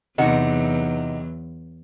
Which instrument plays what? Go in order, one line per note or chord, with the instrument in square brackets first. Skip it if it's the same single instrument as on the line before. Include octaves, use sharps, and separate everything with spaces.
[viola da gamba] E2 F#3 [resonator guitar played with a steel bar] C3 D#4 F#4